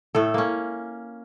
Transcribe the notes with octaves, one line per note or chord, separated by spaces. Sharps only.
A2 A3 A4
A#3 C#4